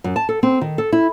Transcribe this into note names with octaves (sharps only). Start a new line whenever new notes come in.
F#2
A5
A4
C4
D#3
A4
E4